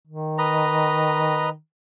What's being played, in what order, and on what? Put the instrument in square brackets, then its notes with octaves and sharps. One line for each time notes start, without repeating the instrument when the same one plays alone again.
[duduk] D#3
[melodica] B4 D#5 A#5